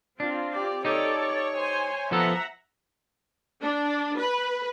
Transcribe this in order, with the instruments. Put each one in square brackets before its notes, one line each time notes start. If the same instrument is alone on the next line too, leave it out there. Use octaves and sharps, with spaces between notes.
[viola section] C4 F4 [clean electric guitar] D4
[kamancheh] G4 D5
[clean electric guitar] D#4 G4 [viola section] A4 D5 [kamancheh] C#5
[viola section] C5 G#5
[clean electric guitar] F3 B3 A4 [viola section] E5 F#5 A#5
[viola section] D4
B4